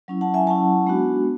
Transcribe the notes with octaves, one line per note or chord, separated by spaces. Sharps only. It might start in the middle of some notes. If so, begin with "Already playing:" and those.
F#3 C#4 E4
F#5 A5
E5 G#5
F#3 C#4 E4 F#5 A5
G#3 B3 D4 F#4